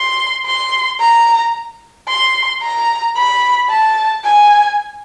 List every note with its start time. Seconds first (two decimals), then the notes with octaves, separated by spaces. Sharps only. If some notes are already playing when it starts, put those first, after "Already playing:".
Already playing: C6
0.46 C6
1.00 A#5
2.08 C6
2.62 A#5
3.16 B5
3.70 A5
4.24 G#5